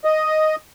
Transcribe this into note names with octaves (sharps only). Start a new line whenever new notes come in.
D#5